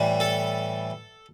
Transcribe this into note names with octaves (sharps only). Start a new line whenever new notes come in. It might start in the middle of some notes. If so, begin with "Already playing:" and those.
Already playing: A2 E3 G3
A4